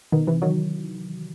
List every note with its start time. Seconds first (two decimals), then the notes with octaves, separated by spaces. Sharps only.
0.12 B2 D#3
0.27 C3 E3
0.42 D#3 F#3